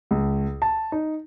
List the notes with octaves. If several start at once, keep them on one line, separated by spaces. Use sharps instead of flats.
C#2
A5
D#4